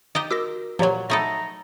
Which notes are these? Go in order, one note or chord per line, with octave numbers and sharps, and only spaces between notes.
D#4 G4 D#5 G5
F#4 A#4 D6 E6 A#6
A#2 F3 F#3 G4 C#5 A#5
A3 D#4 A4 F#5 A#5 B5